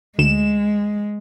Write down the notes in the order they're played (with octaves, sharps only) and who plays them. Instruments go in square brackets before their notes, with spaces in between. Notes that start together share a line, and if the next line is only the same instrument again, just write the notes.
[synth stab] D2 E7 [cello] G#3